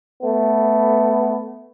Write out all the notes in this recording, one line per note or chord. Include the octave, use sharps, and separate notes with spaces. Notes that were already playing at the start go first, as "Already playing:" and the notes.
A3 B3